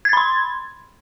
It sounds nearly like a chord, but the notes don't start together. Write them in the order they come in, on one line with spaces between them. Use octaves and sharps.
G#6 A6 B5 C6